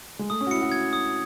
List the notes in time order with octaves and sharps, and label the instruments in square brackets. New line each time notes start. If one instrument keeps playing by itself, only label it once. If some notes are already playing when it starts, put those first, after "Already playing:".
[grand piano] G#3
[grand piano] A3 [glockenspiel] D#6
[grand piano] C#4
F#4
[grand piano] E4 [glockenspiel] C#7
[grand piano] F#4
[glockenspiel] G#6
D#6